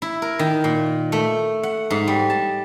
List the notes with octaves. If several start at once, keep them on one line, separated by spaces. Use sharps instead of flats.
E4
A#4
D#3
A#2
A3
F#5
G#2
G3
A5